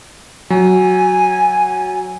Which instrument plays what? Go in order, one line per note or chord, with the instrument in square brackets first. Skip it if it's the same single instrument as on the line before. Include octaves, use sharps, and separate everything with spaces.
[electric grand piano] F#3 [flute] G#5